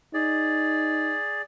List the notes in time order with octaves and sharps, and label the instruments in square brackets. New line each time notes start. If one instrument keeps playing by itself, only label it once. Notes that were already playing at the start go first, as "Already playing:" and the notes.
[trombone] D#4 [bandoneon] G#4 D5